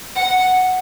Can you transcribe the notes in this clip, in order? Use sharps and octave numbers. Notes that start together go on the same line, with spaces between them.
F#5